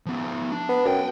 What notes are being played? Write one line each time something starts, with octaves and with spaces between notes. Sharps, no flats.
F3 B3
D4
B3
F#2 F#5 G5